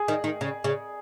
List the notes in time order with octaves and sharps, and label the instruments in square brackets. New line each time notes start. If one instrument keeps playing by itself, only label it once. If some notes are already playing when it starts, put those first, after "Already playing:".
Already playing: [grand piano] G#4
[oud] D#3
D#3
C#3
C#3